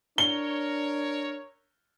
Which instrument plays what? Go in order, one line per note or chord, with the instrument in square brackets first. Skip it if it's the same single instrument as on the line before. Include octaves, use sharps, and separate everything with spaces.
[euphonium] D4 [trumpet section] A#4 C#5 [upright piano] G7